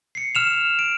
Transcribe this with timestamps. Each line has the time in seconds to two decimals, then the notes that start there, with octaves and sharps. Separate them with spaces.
0.15 C7 C#7
0.35 F6 E7 F7
0.79 D7